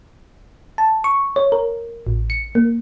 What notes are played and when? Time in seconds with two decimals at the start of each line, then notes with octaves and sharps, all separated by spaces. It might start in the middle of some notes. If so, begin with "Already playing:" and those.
0.78 A5
1.04 C#6
1.36 C#5
1.52 A#4
2.07 A1
2.30 C#7
2.55 A#3